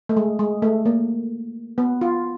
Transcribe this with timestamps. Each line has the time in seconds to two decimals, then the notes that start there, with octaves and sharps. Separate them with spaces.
0.09 A3
0.17 G#3
0.39 G#3
0.62 A3
0.86 A#3
1.78 B3
2.01 F4